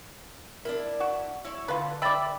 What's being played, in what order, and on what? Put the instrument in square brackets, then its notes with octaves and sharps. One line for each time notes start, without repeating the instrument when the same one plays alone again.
[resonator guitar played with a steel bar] D4 E4 [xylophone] A#4
[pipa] F#4
[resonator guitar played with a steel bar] E4 C#5
[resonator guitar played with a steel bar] D3 [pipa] F4 B4
[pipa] D5 E5 [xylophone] G5 B5 A6